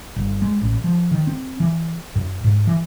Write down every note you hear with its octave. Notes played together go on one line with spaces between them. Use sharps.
G1
G#3
A1
F3
D#3
C4
E3
F#2
G#2
E3